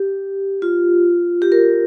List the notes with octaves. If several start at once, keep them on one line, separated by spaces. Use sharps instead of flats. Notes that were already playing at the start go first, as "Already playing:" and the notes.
Already playing: G4
F4
G4
A#4